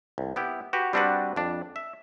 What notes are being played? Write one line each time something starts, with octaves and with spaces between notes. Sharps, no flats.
C2
B3 E4 G4
F#4 G4 B4
G3 C4 D4 F#4 B4 F#5
F2 D4
E5